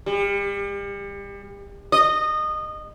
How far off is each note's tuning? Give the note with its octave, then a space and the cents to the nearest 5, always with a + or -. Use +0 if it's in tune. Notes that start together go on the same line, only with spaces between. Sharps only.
G3 +35
D#5 -20